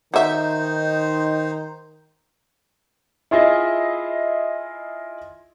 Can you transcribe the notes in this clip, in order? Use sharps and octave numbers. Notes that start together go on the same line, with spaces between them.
D#3 D#4 F#4 C5 E5
E4 F4 G#4 D#5 E5